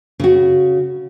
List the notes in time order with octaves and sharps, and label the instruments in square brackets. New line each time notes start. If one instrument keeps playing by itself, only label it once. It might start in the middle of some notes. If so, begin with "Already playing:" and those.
[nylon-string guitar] C#3 F#4